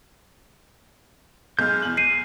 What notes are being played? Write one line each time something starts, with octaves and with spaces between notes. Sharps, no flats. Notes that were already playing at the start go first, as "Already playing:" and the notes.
B1 G#3 F6 G6
E2 F#7
C7 D#7